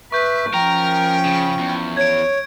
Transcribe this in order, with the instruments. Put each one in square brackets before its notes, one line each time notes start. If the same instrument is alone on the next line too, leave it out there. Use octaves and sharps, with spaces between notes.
[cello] B4 [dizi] E5 [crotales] C#6 G6
[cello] F3 C#4 [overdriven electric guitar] A#4 [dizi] G5
[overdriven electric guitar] C#3
E2
[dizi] C#5 [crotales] G#6 D7